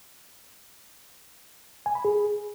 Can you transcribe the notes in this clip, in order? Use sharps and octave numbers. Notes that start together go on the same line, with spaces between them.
G#5
B5
G#4